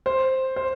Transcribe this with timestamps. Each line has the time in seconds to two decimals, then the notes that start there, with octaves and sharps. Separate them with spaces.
0.06 C5
0.56 C5